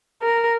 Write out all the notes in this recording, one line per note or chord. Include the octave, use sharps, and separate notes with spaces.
A#4